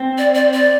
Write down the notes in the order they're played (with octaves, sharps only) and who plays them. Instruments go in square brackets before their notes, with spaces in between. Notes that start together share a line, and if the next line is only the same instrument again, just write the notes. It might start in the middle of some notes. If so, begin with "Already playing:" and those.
Already playing: [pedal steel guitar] C4
[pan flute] D5
D5
D5